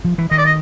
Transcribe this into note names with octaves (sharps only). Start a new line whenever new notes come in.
F3
E3
D#3 D#5
D5
D#5